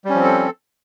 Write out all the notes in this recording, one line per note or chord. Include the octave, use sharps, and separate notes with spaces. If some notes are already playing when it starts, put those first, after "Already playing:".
F3 G3 C4 C#4 A4